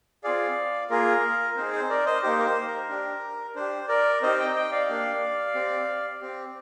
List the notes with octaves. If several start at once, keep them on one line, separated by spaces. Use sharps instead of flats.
C4 F4 G#4 D5 F5
A#3 F4 G#4 A#4
C4 D#4 G#4 C5
C5
A#4 D5
C5 D#5
A#3 D#4 G4 C5
A#4
C5
A#4
D4 G4
D4 G4 C5
A#4 D5
C4 D#4 G4 C5 D#5
D#5 G5
D#5 G5
D5 F5
A#3 D4 G4
C4 G4
C4 G4